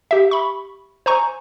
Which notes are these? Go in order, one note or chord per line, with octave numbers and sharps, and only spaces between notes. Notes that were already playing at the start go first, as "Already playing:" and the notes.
G4 E5
B5 C#6
C5 G#5 A#5 C#6